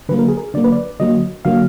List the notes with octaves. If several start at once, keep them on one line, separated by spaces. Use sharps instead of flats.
D3 F#3 A#3 B4
A#4
G#4
A#4
D3 F#3 A#3 D5
B4
D5
D3 F#3 A#3 D#5
D3 F#3 A#3 F5